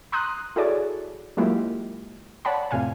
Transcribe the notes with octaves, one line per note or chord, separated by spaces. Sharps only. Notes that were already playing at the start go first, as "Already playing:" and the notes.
A#5 C6 D#6 F#6
E4 F#4 G#4 A4 C#5 D5
F#3 G#3 A#3 E4 F4 G4
C#5 D5 F#5 A5 B5
F2 A2 C3 F5 G#5